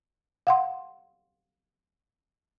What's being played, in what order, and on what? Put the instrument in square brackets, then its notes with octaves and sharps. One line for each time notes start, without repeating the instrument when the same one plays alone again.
[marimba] F5 F#5 C6